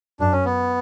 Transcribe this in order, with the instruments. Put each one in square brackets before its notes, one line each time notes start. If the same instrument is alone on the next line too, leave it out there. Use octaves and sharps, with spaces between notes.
[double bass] F#2 [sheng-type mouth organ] D4
[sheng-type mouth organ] C#4
B3